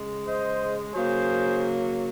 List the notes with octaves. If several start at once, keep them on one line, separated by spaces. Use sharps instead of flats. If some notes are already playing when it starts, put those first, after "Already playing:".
Already playing: C#3 G#3
C5 D#5
C#3 F#3 A#3 G#4 C5